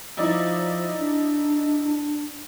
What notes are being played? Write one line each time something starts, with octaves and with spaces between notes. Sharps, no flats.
F3 D#4 E4 D5
D4